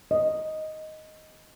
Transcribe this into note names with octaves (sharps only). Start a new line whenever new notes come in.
D#5